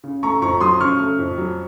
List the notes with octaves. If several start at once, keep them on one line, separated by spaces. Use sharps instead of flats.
C#3
A3 A#5 C#6
F2 A#5 C#6
F#3 C6 D#6
C#3 C#6 F6
A3
F2
F#3